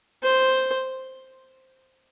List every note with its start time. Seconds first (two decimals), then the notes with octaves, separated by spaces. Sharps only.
0.23 C5